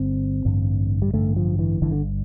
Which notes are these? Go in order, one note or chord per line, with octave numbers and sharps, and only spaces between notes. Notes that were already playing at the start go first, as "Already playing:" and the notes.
Already playing: G1 G2 D3 C4
A1 G2 D3
G3
A1 G2 D3 A3
F3
E3
G1 G2 D3 E3
D3